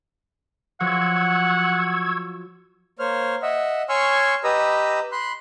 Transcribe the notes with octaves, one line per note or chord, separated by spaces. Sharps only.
F3 F#3 F#5 C#6 E6 G#6
A#3 C5 C#5 F6
D#5 E5 F#5
C#5 G#5 C6 C#6 E6 F6
G4 B4 D#5 A#5 D#6 E6
B5 C6 F#6